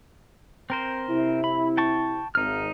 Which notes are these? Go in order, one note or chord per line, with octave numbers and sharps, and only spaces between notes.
C4 A#4 C5
C3 E4
B5
G5 A5 C#6
G#1 D#4 F6